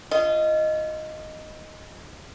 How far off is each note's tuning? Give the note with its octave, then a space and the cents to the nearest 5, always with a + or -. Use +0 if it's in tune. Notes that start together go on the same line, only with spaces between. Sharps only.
F4 -30 D#5 +0